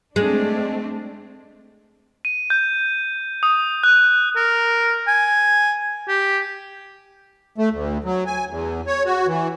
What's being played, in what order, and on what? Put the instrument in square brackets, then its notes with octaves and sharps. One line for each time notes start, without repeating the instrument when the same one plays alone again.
[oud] G#3 [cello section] A3 C4 D4
[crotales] D#7
G6
D#6
F#6
[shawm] A#4
G#5
G4
[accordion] A3
D2
F#3
G#5
E2
C#5
F#4
E3